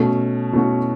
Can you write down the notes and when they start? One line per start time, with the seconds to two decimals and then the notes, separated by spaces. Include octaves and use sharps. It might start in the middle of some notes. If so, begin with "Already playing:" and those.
Already playing: B2 A3 C#4 F#4
0.53 B2 A3 C#4 F#4